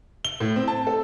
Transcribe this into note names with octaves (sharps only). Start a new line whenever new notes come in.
G7
A2
C4
A5
A4